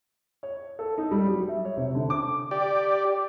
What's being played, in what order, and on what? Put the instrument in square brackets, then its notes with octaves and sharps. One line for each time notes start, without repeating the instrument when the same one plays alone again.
[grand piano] C#5
A4
D#4
G3
F#3
E5
C#5
C3
D3
D6
[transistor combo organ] G4 D5